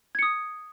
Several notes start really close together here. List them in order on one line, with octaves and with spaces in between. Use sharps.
G#6 C#7 D#6